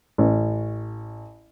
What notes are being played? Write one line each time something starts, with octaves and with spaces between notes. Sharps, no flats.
A1